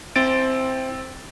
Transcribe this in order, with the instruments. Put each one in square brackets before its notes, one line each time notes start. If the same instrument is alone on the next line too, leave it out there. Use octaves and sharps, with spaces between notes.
[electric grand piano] C4 A6 D7 [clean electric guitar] E4 C5